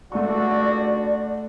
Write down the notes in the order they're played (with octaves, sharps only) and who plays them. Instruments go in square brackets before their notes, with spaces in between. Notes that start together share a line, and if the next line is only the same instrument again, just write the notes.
[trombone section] C#2 D4 F#4 [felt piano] A3 C#6 [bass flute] D5